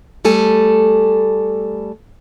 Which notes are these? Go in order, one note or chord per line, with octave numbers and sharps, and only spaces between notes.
G3 A3 A4 G#5